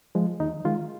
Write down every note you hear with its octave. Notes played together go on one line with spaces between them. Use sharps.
F3 G#3
D#2 D#4
D#3 G#3 F4